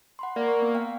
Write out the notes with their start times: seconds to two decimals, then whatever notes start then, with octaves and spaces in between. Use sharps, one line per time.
0.19 F#5 B5 C6
0.36 A#3 D5
0.48 C#6
0.62 B3
0.75 F5 G5